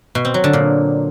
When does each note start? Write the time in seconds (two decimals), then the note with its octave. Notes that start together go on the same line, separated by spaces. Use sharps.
0.15 B2
0.25 C4
0.34 F#3
0.44 D3
0.53 A#2